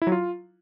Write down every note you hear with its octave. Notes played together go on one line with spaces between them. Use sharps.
E4
F#3
F4